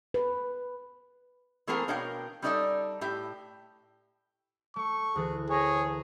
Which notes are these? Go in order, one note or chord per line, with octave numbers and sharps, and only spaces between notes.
B4
E3 A3 A#3 C4 G#4 A#4
B2 D4 A#4 C#5 F5 G5
G3 C#4 D#4 A4 D5 E5
A2 G4 E5
A3 C#6
D2 E3 G#4 A6
G#4 A#4 C#5 G#5